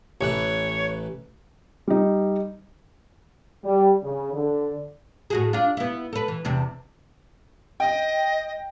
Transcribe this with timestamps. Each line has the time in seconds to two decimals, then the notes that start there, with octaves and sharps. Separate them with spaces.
0.21 A1 E3 B4 C#5
1.88 G3 D#4
3.63 G3
4.03 C#3
4.32 D3
5.30 A2 F#4 G#4
5.53 D4 F4
5.77 B3 E4
6.13 A4 B4
6.28 E3
6.45 E2 C3 D4
7.80 D#5 G5